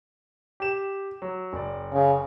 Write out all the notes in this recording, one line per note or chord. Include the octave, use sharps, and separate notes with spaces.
G4 E7
F#3
F#1 D5
C#3